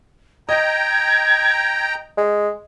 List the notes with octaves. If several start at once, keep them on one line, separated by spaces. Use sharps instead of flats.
D#5 G5 A#5 G#6
G#3